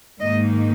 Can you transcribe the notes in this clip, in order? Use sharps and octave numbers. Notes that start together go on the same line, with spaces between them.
G#2 D#3 A#3 D#4 D#5